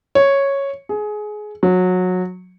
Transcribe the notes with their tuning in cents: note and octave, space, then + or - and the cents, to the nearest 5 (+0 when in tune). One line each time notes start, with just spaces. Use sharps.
C#5 -5
G#4 +20
F#3 -20